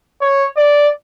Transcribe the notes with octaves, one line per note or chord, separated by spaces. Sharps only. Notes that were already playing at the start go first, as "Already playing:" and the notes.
C#5
D5